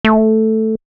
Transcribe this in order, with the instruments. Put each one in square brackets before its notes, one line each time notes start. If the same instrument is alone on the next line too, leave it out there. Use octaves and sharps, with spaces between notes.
[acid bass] A3